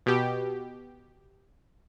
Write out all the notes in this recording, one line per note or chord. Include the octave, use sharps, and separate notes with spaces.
B2 G4